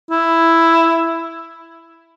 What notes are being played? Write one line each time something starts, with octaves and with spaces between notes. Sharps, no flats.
E4